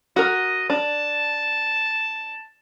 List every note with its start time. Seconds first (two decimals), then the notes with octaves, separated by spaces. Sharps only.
0.16 F#4 A#4 D#5
0.70 D4 A5